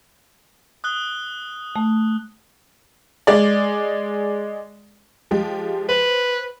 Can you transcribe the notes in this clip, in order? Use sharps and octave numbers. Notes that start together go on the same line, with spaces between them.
D#6 F#6 G7
A3
G#3 D5
F3 G#3 G4
B4 C5